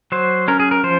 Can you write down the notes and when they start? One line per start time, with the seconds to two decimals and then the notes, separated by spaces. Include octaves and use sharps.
0.12 F#3 C5
0.48 C#4 A#4
0.60 G#4
0.71 A#4
0.84 F3 C5